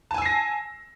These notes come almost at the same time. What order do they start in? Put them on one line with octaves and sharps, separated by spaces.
A5 G#5 E6 C7 A#6